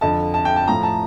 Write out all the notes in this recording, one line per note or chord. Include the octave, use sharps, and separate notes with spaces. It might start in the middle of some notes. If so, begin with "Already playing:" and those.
F2 D3 F3 A5
A5
G5
A5
A2 F3 A#5
A5